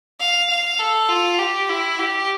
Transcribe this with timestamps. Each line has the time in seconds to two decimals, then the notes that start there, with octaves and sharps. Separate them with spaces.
0.20 F5
0.50 F5
0.79 A4
1.09 F4
1.39 G4
1.69 E4
2.00 G4